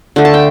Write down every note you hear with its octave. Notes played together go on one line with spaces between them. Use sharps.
D3 A3
A5
G5